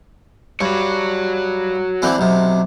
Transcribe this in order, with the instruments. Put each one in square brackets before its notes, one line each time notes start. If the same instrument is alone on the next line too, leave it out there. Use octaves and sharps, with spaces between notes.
[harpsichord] G2 [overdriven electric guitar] F#4 C#5
[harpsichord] D3 E3 C4
B1 C3